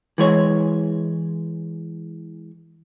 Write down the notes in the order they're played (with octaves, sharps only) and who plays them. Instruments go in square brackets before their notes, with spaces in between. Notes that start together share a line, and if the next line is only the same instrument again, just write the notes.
[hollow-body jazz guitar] E3 G#3 C#5